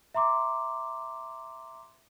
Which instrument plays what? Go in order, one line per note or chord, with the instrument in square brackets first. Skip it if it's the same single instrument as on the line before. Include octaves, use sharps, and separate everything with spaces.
[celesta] E5 A#5 C6 D6